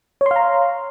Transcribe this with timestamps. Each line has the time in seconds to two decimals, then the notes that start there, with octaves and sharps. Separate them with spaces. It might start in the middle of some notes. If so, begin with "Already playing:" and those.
0.21 C#5
0.26 C6
0.31 F5
0.36 A#5